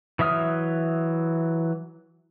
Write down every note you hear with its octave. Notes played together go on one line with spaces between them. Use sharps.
E3 F#3 E5 D#6 F6